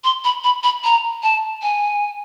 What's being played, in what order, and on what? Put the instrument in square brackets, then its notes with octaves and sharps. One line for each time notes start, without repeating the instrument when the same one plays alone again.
[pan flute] C6
B5
B5
B5
A#5
A5
G#5